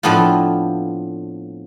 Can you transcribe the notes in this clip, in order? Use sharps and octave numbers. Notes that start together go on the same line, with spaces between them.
A2 F3 B3 C4 D4 F4